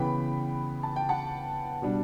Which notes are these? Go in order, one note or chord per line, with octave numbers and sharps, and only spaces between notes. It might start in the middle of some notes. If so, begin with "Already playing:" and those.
Already playing: C#3 E3 B3 G5 B5
A5
G5
F#5 A5
B2 G3 D4